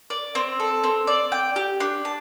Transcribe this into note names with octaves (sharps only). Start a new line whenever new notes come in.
D5
C4
A4
C4
D5
G5
G4
D4
A5